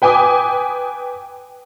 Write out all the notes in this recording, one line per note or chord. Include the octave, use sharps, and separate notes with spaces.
B4 G5 G#5 D6 D#6